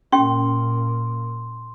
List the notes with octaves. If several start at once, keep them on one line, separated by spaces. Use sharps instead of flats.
A#2 A#3 C#4 G4 G5 C6